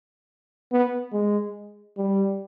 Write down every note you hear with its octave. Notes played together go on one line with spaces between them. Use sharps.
B3
G#3
G3